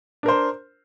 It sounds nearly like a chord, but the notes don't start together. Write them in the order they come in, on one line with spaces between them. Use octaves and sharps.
D4 A#4 C5